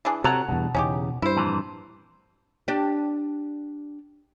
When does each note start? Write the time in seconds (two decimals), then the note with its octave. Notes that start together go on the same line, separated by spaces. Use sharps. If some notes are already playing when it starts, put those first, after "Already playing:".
0.05 E3 D4 G#4
0.24 C3 F#4 A4 C#5 F#5 A#5
0.48 E2 G2 B2
0.75 E2 C#3 C#4 D#4 G4
1.22 G2 E4 C5
1.37 F2 A#2 E3
2.68 D4 G4